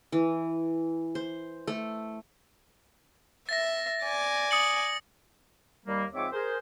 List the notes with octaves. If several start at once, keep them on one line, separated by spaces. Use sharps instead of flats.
E3
C5
A3
E5 A6 A#6
D5 G#5
D#6 C#7 F#7
D#2 G3 A#3
G#2 F3 C4 C#5 E5 D6
G#4 A#4 C5